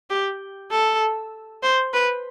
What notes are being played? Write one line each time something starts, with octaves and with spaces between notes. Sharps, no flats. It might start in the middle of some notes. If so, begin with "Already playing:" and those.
G4
A4
C5
B4